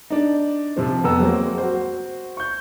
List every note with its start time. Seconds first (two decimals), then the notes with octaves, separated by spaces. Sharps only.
0.10 D4 D#4
0.76 C3 F3 C4
1.04 F2 B3 A#5 E6
1.19 F#3 G#3 A#3 C4
1.58 F#4 C5
2.37 C#6 G6